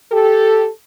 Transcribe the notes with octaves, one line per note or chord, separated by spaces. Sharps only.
G4 A4